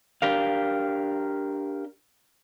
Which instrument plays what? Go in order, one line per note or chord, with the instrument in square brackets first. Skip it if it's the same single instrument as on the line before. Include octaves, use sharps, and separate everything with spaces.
[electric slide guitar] D4 G4 A#4 F5